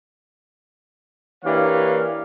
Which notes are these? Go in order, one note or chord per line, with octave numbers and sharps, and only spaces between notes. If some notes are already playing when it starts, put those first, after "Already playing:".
E3 A#3 D4 G4 C#5 F5